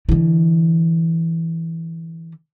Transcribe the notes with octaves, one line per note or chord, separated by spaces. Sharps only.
D3 E3